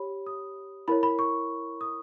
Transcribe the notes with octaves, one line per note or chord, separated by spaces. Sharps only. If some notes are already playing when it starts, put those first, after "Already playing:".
Already playing: G4 C#5 B5
D#6
E4 A#4 C#5 B5
B5
C#6
D#6